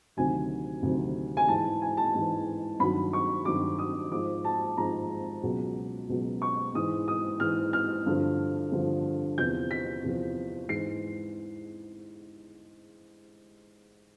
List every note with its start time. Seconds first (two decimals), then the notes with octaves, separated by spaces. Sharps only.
0.17 D2 C3 D#3 F#3 G#5
0.82 D2 C3 D#3 F#3
1.37 G#5
1.48 G#2 E3 A5
1.82 G#5
1.97 A5
2.15 G#2 E3
2.80 G2 D#3 F#3 B5
3.13 C#6
3.45 G2 D#3 F#3 D6
3.79 D#6
4.11 G#2 F3 D6
4.44 A5
4.77 G#2 F3 A#5
5.43 C#2 B2 F#3
6.09 C#2 B2 F#3
6.42 C#6
6.75 G#2 E3 D#6
7.08 D#6
7.40 G#2 E3 F6
7.73 F6
8.06 G2 D3 F3
8.72 G2 D3 F3
9.38 E2 C3 F3 G6
9.71 B6
10.04 E2 C3 F3
10.69 G#2 E3 C7